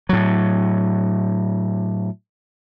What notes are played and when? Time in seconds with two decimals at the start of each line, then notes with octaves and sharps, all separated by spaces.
0.09 A2 F#3